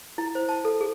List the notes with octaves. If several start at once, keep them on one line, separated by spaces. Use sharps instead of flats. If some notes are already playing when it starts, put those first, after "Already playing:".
E4
C5
A5
A4
G#4